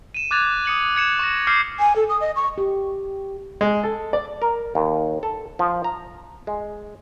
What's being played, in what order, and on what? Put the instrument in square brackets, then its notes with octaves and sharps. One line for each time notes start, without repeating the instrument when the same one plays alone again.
[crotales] D#7 E7
D6 F#6 G#6 A6 F7
D#6 C#7 F#7
G#6 C#7 E7
C#6 A#6
D6 F6 G6 C7 C#7
[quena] G#5
A4
D#6
D#5
C#6
[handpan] G4
[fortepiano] G#3
A4
D5
[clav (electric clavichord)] A#4
D#2
A4
F3
A#5
G#3